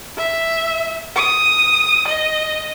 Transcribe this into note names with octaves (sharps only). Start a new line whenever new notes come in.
E5
D#6
D#5